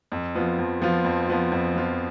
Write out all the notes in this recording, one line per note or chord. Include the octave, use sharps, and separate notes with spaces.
F2
F3 B3 F4
F2
F3 B3 F4
F2
F3 B3 F4
F2
F3 B3 F4